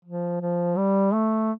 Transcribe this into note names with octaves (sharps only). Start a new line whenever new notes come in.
F3
F3
G3
A3